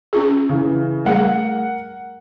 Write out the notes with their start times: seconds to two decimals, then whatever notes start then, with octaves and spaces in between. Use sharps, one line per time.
0.13 C#4 F4 G#4
0.49 C#3 E3
1.05 G3 A3 G#4 A#4 F#5